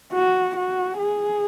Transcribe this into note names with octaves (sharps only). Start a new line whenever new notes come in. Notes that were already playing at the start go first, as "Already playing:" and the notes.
F#4
F#4
G#4